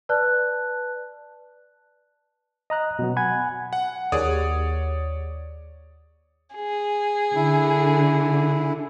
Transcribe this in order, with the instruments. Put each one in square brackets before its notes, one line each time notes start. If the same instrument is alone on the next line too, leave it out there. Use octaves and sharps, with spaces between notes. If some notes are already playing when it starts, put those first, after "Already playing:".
[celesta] B4 D5 A5 F#6
[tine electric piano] D#5 A#5 F#6
B2 F#3 B3
F#5 G#5 B5 F#6 G#6
[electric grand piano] F#5
[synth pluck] D#2 G#4 F#5 [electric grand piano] C#5 D5 D#6
[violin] G#4
[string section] D3 [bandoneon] E4